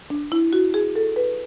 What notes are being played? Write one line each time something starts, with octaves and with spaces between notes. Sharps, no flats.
D4
E4
F#4
G#4
A4
B4